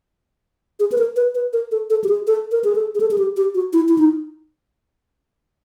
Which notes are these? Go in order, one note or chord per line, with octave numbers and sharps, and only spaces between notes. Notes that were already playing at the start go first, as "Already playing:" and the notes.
G#4
B4
A#4
B4
B4
A#4
A4
A4
G4
G#4
A4
A#4
G#4
A4
G#4
A4
G#4
G4
G4
F#4
E4
E4
D#4